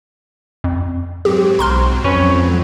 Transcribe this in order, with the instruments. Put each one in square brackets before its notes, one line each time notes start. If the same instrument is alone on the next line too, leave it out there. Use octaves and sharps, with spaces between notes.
[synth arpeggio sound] F2
[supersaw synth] G#2 F#3 C4 [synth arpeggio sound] G4
[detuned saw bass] B1 [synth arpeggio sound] A#5 C6 F6
[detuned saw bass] F2 [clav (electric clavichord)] C#4 B4 C#5